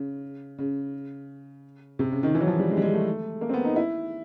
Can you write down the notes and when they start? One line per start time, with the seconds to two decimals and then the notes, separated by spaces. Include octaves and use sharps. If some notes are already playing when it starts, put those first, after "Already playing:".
Already playing: C#3
0.58 C#3
1.99 C3
2.12 C#3
2.23 D#3
2.35 E3
2.41 F#3
2.47 F3
2.59 G3
2.71 G#3
2.77 G3
2.82 G#3
2.93 A3
3.41 A#3
3.49 C4
3.54 B3
3.65 D#4
3.76 E4